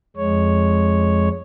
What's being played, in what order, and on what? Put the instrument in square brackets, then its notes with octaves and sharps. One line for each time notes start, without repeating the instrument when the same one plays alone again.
[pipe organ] F2 G#3 C#5